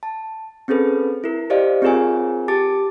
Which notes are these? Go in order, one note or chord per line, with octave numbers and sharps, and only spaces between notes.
A5
C4 C#4 G#4 A4 B4
E4 A#4
G4 C5 D5 D#5 F5
C4 F4 G#4 A#4 C#5 G#5
G4 A5 D6 A6